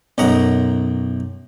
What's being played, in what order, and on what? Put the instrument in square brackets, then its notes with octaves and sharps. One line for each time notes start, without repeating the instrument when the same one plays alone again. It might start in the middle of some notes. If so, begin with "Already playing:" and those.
[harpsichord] B1 F#2 D#5 F#5 A#5